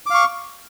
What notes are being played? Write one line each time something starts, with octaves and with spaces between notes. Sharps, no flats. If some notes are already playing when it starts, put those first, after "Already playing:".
F5 C#6 D6